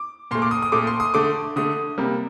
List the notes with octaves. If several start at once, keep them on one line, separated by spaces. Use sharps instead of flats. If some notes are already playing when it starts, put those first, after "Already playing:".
Already playing: D6
A#2 A3 C6
D6
D#6
D#6
A#2 A3 D6
C6
D#6
D3 A3 D6
D3 A3 D#6
C3 G3 A#3